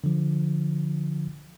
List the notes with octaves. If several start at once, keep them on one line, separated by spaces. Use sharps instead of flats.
D3 F3